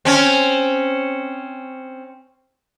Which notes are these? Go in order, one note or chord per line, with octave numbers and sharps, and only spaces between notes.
C4 C#4